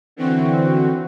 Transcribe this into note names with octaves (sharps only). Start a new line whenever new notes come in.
D3 E3 C4 F#4